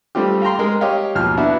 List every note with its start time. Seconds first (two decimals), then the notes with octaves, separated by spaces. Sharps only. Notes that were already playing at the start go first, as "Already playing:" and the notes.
0.15 G3 A3 C4 F4 G4
0.42 F5 G5 A#5 C6
0.59 G#3 A#4
0.81 G4 C#5 D#5 F5 G5
1.15 D#2 B2 F3 F6
1.37 B3 D4 E4 F#4